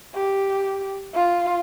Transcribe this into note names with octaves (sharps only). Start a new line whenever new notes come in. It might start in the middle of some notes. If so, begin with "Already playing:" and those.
G4
F4